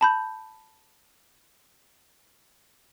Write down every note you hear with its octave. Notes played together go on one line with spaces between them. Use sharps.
A5 B5 G6